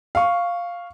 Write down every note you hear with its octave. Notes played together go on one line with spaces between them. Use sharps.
F5 C#6